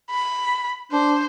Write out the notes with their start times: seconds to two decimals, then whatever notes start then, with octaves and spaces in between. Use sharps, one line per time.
0.11 B5
0.92 D4 C5